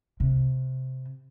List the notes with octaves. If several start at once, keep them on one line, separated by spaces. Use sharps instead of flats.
C3